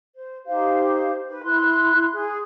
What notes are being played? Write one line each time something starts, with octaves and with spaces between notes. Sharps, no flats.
C5
D#4 G4 C5 F5
B4
E4 C6 F#6
G#4